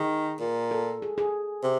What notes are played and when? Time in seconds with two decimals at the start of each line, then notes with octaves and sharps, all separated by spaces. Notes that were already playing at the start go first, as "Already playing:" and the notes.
Already playing: D#3 G#4
0.40 A#2
0.71 A4
1.02 G#4
1.18 G#4
1.63 C3